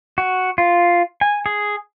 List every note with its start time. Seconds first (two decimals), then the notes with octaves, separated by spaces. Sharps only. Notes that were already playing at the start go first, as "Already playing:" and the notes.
0.18 F#4
0.58 F4
1.21 G#5
1.46 G#4